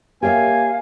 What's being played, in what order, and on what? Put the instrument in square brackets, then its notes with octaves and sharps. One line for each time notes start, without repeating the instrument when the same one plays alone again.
[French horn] A#3 [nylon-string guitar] G4 C#5 E5 [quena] F5 [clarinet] G#5